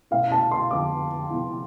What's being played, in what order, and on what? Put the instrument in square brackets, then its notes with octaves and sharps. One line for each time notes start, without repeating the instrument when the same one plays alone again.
[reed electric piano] B2 A3 E4 [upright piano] F5
[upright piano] A5
C6
[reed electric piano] F2 D3 F3 [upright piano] D6
[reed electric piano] C3 F3 B3 E4